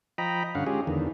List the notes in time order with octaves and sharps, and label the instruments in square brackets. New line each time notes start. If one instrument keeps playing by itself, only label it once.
[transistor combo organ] F3 D#5 G5 A#5 B5
G2 D3 C#4 F5 F#5
G#3 C#4 F4 G4 G#4
E2 D3 D#3